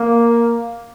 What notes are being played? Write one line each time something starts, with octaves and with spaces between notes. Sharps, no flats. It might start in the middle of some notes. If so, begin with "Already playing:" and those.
Already playing: A#3